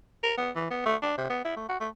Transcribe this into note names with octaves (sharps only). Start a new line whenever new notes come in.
A#4
B3
E3
B3
A3
D4
C3
B3
E4
A3
F#4
A3